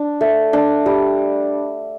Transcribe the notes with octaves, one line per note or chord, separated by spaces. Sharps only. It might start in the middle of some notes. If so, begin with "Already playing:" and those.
Already playing: D4
A3
D4
G3